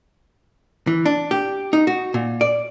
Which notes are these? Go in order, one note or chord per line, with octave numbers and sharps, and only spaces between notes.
E3
D4
G4
D#4
F#4
A#2
D5